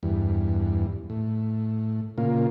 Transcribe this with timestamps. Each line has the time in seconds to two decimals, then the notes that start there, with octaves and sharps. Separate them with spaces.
0.03 E2 G2
1.10 A2
2.18 A#2 C#3 A#3 F4